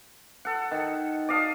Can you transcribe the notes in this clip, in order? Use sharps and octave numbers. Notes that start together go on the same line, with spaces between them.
A4 F#5
D#3
D5 D#5 F5 A5